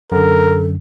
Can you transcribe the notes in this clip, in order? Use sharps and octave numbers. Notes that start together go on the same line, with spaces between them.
F#2 D3 A4 A#4